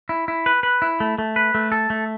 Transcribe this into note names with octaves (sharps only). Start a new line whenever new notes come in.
E4
E4
B4
B4
E4
A3
A3
B4
A3
A4
A3